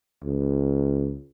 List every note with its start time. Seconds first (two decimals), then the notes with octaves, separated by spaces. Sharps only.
0.23 C#2